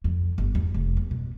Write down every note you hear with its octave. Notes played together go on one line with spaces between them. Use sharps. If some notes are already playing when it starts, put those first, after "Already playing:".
F2
G1
E2
F1
E2
B2